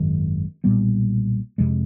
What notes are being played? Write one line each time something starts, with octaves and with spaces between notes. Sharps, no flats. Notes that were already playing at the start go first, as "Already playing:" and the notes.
Already playing: G#1 F#2 D#3 G#3
B1 A#2 G3 B3
F2 C3 F3 G#3